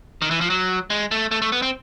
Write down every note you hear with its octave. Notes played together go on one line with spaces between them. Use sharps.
D#3
E3
F3
F#3
G#3
A3
A3
A3
B3
C4